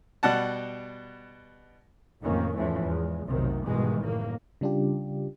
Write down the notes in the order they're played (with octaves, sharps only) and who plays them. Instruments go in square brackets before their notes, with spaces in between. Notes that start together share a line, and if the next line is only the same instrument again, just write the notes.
[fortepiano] B2 G3 F#5 A5
[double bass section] A1 F2 D#3 A#3 C#4
E2 G#2 E3 F3 A3 C#4
E2 G#3
F1 B1 C3 D#3 F#3
G#2 B2 D#3 E3 G3 G#3
F#1 A2 A#3
[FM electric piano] C#3 G3 D4 F4 G4